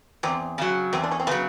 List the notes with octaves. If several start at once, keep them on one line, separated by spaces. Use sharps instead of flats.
E2 C4
C#3 F#3
E2 C4
D4
C#4
C4
C#3 F#3 B3